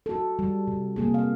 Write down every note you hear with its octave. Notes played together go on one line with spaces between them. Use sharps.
F#4 A4
G3
C3
C3 A#3 G#4
F5